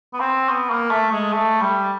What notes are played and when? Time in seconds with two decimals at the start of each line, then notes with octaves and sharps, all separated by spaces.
0.14 B3
0.20 C4
0.49 B3
0.70 A#3
0.90 A3
1.12 G#3
1.33 A3
1.61 G3